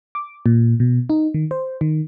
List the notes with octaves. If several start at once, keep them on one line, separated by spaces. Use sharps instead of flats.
D6
A#2
B2
D#4
D#3
C5
D#3